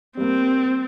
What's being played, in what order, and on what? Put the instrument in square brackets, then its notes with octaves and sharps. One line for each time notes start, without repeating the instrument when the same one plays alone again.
[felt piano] G3 A#3 [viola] C4